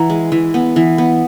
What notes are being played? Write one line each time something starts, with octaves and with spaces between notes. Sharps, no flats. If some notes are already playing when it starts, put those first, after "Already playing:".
Already playing: E3 F#5 A#5
G#3
E3
B3
E3
B3